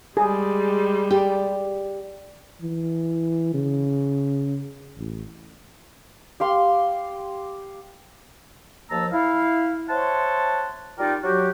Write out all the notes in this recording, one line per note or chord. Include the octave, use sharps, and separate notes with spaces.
G3 G#3 G#4
G4 D5
E3
C#3
A1
G4 F5 C6
D#2 F3 A#3 A5 A#5 E6
E4 F5
C5 C#5 E5 F#5 A5 C6
G3 D#4 F4 A#4 D5 G5
F#3 F#4 G4